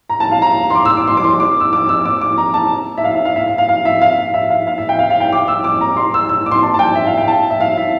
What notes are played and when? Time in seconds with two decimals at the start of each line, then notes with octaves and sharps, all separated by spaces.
0.09 A#5
0.20 A5
0.31 F5
0.42 A#5
0.70 C6
0.75 D6
0.85 E6
0.97 D6
1.07 C6
1.17 D6
1.24 C6
1.40 D6
1.60 E6
1.73 D6
1.89 E6
2.05 D6
2.21 D6
2.38 A#5
2.54 A5
2.98 E5
3.04 F5
3.14 E5
3.25 F5
3.36 E5
3.47 F5
3.58 F5
3.69 F5
3.85 E5
4.01 F5
4.18 F5
4.34 E5
4.50 F5
4.67 F5
4.78 E5
4.89 G5
4.99 F5
5.10 F5
5.20 G5
5.33 D6
5.48 E6
5.64 D6
5.81 A#5
5.97 C6
6.14 E6
6.29 E6
6.46 D6
6.51 C6
6.63 A5
6.74 A5
6.79 G5
6.95 E5
7.07 F5
7.17 G5
7.28 A5
7.50 E5
7.60 F5
7.77 E5